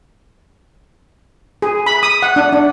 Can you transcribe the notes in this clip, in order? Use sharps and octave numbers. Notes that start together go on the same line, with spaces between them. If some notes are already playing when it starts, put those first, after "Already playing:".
G#4
B5
D#6
F#5
D4
D4